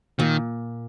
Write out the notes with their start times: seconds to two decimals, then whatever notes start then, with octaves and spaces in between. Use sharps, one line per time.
0.19 A#2 D#3